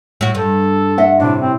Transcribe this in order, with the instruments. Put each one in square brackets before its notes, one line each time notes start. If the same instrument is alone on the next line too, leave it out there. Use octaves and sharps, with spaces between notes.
[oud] A2 F#4
[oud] G2 [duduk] A4
[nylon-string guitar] D#5 E5 F#5
[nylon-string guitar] A2 C3 G3 [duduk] D4
[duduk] C4